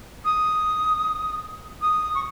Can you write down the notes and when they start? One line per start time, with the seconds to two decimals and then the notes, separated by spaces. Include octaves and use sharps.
0.24 D#6
1.81 D#6
2.14 C#6